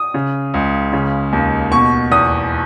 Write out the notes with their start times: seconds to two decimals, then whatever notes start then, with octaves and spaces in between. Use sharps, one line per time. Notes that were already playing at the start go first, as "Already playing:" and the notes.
Already playing: D#6
0.14 C#3
0.54 C#2
0.93 C#3
1.33 D#2
1.72 B2 C#6
2.11 E2 D#6